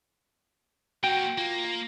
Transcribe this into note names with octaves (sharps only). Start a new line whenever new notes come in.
A#3 C#4 F#4 G5
A#3 F4